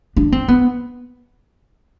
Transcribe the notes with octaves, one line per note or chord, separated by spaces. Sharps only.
D4
C4
B3